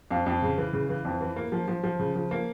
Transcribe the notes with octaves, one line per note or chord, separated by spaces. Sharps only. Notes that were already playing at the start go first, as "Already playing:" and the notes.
F2 F5
F2
C#3
E3
C#3
E3
F2
E3
A#3
F3
F3
F3
C#3
F3
A#3